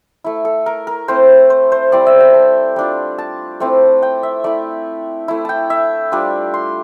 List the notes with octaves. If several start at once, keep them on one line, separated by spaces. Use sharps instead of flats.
A3 E4
A4
A#4
A#4
A3 C4 E4 C5
C5
C5
G3 C4 E4 D5
E5
G5
A5
G3 D4 F4
A5
A3 C4 E4
G5
E5
A3 E4 D5
A3 E4
G5 A5
E5
G3 D4 F4
C6